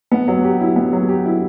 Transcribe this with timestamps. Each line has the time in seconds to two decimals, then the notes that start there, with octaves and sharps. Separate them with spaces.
0.12 B3
0.28 F#3
0.44 G4
0.61 E4
0.76 B3
0.93 F#3
1.09 G4
1.26 E4